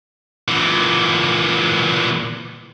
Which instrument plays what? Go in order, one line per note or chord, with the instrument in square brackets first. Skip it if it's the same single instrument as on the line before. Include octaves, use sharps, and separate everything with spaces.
[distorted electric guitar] A#2 E3